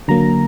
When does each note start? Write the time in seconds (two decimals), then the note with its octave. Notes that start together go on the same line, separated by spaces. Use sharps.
0.08 D3 F#3 A#3 A#5